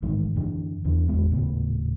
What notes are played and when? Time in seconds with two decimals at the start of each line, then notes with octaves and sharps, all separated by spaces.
0.02 A1 G#2 D#3
0.36 F#2 D3 E3
0.85 E2 D3
1.08 G#1 E2 G#3 B3
1.31 D#1 A2 C#3 B3